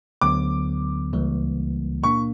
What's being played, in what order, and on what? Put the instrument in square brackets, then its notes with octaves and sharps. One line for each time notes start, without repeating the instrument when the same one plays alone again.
[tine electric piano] D2 D3 F#3 B3 [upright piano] D6
[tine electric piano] C#2 C#3 E3 G3 A#3
[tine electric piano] A#2 A#3 D4 [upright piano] C#6